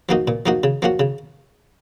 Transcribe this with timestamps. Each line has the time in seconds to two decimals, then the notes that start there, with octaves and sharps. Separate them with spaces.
0.09 F3 A#3 D#4 F#4
0.28 A#2
0.46 F3 A#3 D#4 F#4
0.63 C#3
0.82 F3 A#3 C#4 F#4
1.00 C#3